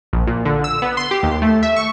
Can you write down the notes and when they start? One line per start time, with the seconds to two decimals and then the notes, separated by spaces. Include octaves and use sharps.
0.13 A#1
0.27 A#2
0.45 D3
0.64 E6
0.82 B3
0.97 C6
1.11 G4
1.23 D#2
1.42 A3
1.63 E5
1.76 C#6